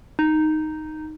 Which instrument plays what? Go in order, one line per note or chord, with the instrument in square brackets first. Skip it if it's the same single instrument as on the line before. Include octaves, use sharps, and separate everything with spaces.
[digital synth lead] D#4